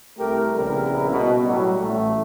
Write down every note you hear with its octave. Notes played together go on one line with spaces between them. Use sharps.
C2 A3 G4 A#4
A#1 C#3 G3 B3 E4 A#4
B2
A2 F#3 G3
A1 A2 A3